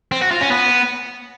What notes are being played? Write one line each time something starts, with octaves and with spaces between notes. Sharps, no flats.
C4
F#4
F4
C#4
B3